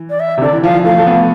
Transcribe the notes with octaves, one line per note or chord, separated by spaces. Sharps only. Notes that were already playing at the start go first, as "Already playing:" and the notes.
Already playing: E3
D5
E5
C3
D3 D5
E3
F3 F5
E3
A3 F5
A3
B3